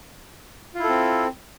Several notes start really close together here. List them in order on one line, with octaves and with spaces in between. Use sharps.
F4 E4 A4 C4